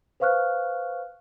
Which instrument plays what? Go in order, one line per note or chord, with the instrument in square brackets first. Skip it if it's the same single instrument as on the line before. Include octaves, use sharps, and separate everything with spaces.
[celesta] B4 C5 F5 C#6 F6 F#6